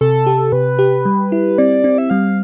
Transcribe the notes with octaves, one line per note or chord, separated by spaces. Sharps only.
C3 A4
G4
C3 B4
G4
G3
E4
C4 D5
C4
E5
G3 F5